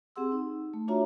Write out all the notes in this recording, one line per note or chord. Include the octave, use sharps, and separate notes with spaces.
C4 G4 G#4 F#5 C6 E6
D#4
A3
D4 F4 F#4 C#5 E5 A#5